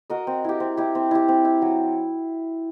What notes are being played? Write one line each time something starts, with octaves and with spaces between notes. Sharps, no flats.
F#4 A#4 D#5
C4
E4 G4
C4
E4 G4
C4
E4 G4
C4
E4 G4
F#3